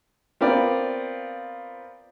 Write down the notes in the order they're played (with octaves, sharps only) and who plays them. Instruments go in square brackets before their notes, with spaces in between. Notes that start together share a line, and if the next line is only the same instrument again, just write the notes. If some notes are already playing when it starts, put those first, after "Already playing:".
[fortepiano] B3 C4 F4 A#4 D5